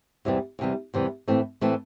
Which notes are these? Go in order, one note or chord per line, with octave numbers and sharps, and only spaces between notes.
E2 C3 E3 G3
E2 C3 E3 G3
E2 C3 E3 G3
A2 E3 A3 C4
A2 E3 A3 C4